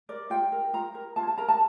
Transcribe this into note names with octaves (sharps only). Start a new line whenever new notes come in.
A#4 D5
F4 G5
A#4
F4 A#5
A#4
F4 A5
A5
A#4 A#5
A5